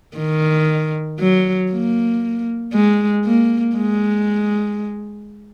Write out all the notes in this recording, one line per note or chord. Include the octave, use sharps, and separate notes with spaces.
D#3
F#3
A#3
G#3
A#3
G#3